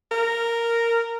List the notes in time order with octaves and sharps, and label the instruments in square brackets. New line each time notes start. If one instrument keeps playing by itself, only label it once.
[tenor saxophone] A#4